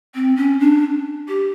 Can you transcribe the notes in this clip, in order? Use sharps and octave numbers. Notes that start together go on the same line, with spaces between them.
C4
C#4
D4
G4